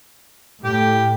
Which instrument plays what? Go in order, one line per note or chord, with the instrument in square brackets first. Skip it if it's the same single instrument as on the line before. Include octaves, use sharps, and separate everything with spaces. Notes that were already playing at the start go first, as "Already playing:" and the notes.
[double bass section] A2 [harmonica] G4